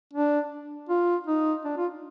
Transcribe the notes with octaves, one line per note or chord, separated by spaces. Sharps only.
D4
F4
D#4
D4
F4